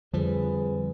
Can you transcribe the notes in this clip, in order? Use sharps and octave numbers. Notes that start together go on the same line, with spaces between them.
F2 D3 F3 G3 G#4 B4